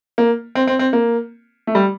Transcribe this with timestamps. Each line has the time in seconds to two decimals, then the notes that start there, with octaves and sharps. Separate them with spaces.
0.18 A#3
0.55 C4
0.67 C4
0.79 C4
0.93 A#3
1.67 A3
1.75 G3